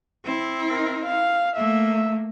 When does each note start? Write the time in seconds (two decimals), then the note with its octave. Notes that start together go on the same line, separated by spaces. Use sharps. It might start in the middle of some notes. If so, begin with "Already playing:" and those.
0.25 C4 E4
0.71 A#4
1.06 F5
1.57 A3 A#3 E5